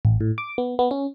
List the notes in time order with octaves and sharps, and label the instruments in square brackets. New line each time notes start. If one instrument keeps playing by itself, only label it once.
[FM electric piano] A1
A2
D6
B3
B3
C#4